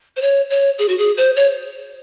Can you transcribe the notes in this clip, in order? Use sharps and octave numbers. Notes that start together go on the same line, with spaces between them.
C5
C#5
C#5
G#4
F#4
G#4
C5
C#5